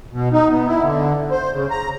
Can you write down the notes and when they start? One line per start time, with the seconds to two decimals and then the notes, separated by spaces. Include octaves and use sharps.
0.13 B2
0.32 D#4
0.51 B3
0.67 E4
0.83 D3
1.31 C5
1.53 C#3
1.71 A#5